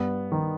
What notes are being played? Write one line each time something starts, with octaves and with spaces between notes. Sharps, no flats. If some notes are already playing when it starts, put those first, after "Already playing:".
Already playing: G2 B3
D#3